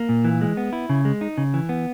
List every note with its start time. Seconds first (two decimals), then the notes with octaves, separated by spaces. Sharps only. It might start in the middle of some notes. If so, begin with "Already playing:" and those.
Already playing: A#3
0.09 A#2
0.24 E3
0.41 G#3
0.57 B3
0.73 E4
0.89 C#3
1.05 G#3
1.21 D#4
1.38 C#3
1.54 E3
1.69 B3